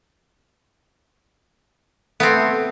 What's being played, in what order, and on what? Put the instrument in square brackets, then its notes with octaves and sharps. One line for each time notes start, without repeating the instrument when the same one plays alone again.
[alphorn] A3 [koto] B3 C4